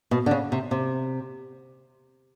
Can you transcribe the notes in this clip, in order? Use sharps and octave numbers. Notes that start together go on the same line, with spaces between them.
B2
D3
C#3
C3
C3